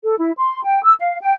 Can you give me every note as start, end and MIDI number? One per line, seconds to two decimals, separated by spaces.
0.02 0.16 69
0.17 0.31 64
0.37 0.62 84
0.63 0.81 79
0.84 0.93 88
0.99 1.18 77
1.21 1.33 79